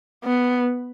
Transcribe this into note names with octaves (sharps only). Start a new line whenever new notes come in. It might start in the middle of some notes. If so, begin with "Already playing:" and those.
B3